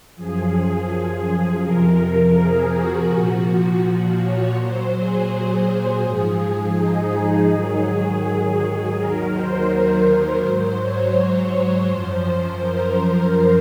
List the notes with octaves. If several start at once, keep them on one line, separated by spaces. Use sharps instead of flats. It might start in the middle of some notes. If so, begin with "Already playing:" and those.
F#2 F3 G#4
G#4
G#4
F2 C3 F3 A#4
A#4
G#4
F#4
A#2 F3
F#4
C#5
A#2 F#3 C5
G#4
G#2 F3
D#4
G#2 D#3 F#3 G#4
D#2 D#3 F#3 A#4
C5
C5
A#4
G#2 F#3 C5
C#5
C#5
C#5
F#2 F3 C5
A#4